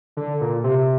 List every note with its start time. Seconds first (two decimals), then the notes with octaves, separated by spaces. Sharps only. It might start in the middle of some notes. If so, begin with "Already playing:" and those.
0.17 D3
0.41 A#2
0.64 C3